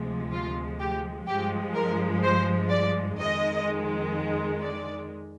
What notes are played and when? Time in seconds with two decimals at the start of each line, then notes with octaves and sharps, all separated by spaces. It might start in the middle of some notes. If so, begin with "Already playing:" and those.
Already playing: D2 C3 F3 G#3
0.33 F4
0.80 G4
1.28 G2 F3 G#3 G4
1.75 A#4
2.24 C5
2.70 D5
3.19 F2 D#3 G#3 D#5
4.62 D5